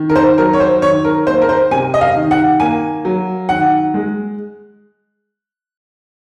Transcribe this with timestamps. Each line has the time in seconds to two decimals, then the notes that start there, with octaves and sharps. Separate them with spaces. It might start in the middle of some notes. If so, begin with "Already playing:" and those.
Already playing: D#3
0.10 A#4
0.16 C5
0.38 F#3 A#4
0.53 C#5
0.60 C5
0.82 D#3 C#5
1.05 A#4
1.27 A#3 C5
1.42 A#4
1.49 C5
1.71 C3 G#5
1.94 D#5
2.01 F5
2.16 D#3
2.31 F#5
2.60 A#3 G#5
3.05 F#3
3.49 D#3 F#5
3.94 G#3